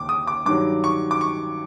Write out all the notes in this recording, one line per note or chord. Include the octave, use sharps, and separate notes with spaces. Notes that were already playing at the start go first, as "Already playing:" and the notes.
Already playing: D#2 C#3 D6
D#6
D6
G2 D#3 F#3 D6
C#6
D6
C#6